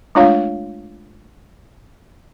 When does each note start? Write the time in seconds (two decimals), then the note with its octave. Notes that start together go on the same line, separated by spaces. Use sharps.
0.15 G#3 A3 D4 F4 C#5 F5